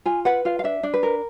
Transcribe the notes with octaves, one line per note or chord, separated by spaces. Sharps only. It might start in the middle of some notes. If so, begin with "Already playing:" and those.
F4 G#5
B4 F#5
F4 F5
F5
D4 E5
D4
B4
A#4